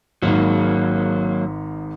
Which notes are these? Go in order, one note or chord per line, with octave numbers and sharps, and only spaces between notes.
G#1 G#2 F#3 A#3